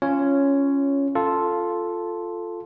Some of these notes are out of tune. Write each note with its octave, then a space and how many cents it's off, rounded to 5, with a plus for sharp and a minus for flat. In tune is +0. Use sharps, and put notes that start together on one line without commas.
C#4 +0 F4 -15 C#5 +5
F4 +0 A4 +0